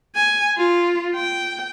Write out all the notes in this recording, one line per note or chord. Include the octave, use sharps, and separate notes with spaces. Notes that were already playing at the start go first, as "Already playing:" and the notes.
G#5
F4
G5